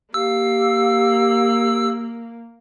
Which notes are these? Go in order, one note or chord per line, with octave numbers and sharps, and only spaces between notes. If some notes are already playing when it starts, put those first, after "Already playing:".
A#3 G4 F5 E6